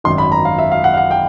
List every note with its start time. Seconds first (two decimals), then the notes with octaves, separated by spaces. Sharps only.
0.04 G#1 F#2 D#3 C6
0.18 B5
0.32 A#5
0.45 F5
0.59 E5
0.72 F5
0.84 F#5
0.94 F5
0.98 F#5
1.11 G5